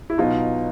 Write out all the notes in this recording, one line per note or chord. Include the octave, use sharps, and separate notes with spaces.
E4
B2 F#3 B3 D#4 F4